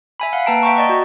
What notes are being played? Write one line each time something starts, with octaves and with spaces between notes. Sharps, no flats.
E5 G#5 B5
F5 F#5
A#3 B4 G5 A5 A#5 D7
E5 F#5 G5 A#5 C#6
D5 D#5 C#6
F#4